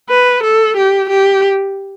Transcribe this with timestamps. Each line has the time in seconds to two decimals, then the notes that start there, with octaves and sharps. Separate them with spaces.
0.10 B4
0.43 A4
0.76 G4
1.09 G4